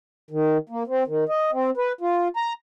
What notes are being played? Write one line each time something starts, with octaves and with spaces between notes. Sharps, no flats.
D#3
A#3
C4
D#3
D#5
C4
B4
F4
A#5